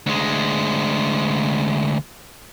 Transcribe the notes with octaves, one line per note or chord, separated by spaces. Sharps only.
D2 G#3